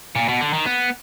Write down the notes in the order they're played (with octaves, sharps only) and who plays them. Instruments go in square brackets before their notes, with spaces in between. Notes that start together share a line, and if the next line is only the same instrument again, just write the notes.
[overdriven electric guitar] A#2
B2
D3
D#3
B3